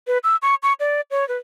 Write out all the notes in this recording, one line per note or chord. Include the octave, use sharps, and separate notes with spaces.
B4
E6
C#6
C#6
D5
C#5
B4